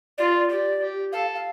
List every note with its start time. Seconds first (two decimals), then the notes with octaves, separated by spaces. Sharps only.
0.18 F4 D5
0.49 G4 D5
0.82 G4
1.13 A4 F5
1.35 F5